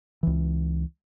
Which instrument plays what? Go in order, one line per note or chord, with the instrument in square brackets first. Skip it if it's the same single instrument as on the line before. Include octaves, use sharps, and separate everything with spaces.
[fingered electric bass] C#2 E3